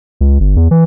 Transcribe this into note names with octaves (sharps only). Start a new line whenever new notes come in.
C#2
G1
E2
E3